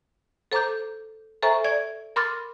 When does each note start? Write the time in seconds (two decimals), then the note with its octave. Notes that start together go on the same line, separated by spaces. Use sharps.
0.52 A4 C5 A#5 D6 G6
1.42 A4 C5 E5 G#5 A#5 C#6
1.64 D5 G#6
2.16 A#4 B5 C6 D6 F6 A6